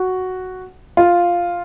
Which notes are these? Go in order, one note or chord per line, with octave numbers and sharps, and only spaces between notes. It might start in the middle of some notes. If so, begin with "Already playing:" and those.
Already playing: F#4
F4